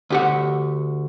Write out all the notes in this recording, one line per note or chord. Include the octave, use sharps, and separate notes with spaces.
D2 G4 F#5